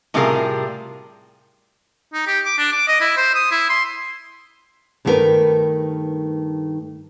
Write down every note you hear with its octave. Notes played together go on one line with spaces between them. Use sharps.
A2 C3 G3 F4 G#4 A#4
D#4
G4
D6
D4
D6
D#5
E4
C5
D#6
E4
C6
G2 D#3 A3 F4 A#4 B4